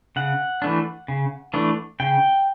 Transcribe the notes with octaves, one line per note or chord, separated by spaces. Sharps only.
C#3 F#5
E3 A3 D4
C#3
E3 A3 D4
C#3 G5